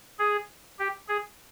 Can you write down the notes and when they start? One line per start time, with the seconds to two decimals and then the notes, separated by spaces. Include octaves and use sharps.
0.19 G#4
0.79 G4
1.08 G#4